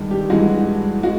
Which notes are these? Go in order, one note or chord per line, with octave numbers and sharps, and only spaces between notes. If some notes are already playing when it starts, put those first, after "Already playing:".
Already playing: G2 D#3 G#3
G4
G2 E3 G#3 F#4
G#3 F#4